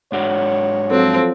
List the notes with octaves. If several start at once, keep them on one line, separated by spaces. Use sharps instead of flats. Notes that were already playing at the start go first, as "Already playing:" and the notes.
G#2 D4 F#4 C#5
F3 F#3 C4 A4